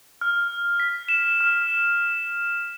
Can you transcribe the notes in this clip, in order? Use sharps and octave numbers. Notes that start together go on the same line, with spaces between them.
F6
B6
E7
F6